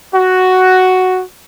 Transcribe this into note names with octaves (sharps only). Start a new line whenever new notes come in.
F#4